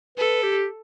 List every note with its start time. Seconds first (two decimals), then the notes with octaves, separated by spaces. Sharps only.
0.18 A4 B4
0.43 G4